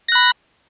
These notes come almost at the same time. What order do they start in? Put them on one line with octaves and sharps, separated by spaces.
A#6 F#6 B5